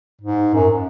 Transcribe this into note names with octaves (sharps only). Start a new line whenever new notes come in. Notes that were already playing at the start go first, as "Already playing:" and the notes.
G#2
F#2